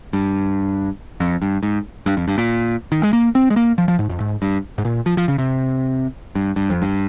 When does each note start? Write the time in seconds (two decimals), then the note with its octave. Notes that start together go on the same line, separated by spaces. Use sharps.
0.13 G2
1.20 F2
1.42 G2
1.63 G#2
2.06 G2
2.17 F2
2.28 G2
2.38 A#2
2.92 D#3
3.03 G#3
3.13 A#3
3.35 C4
3.50 G#3
3.56 A#3
3.78 F3
3.88 F3
3.99 G#2
4.10 F2
4.20 G#2
4.42 G2
4.78 G#2
4.85 A#2
5.06 F3
5.17 F3
5.28 C#3
5.38 C3
6.35 G2
6.56 G2
6.70 F2
6.82 G2